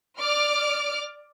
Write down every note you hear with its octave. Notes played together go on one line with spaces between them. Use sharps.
D5 D6 F6